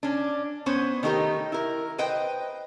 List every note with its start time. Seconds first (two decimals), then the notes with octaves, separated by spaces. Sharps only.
0.03 C#4 D4
0.66 B3 C#4 C5 C#5
1.03 D#3 A3 D#4 G4 A#4
1.52 E4 A#4
1.98 B4 C5 D#5 G5